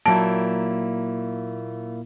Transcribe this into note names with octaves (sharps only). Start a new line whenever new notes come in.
A#2 F#3 A#3 E4 A5 D7